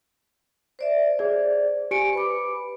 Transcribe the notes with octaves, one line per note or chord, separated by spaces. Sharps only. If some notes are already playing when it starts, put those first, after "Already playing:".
C5 D5 E5
G#4 C5 D5
G4 G#5 C#7 D7
B4 B5 D6